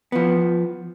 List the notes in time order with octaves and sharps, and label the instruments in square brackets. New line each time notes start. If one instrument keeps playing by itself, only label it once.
[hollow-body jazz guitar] F3 B3